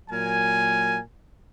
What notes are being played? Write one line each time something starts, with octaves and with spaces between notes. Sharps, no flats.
A#2 F#3 A#4 G#5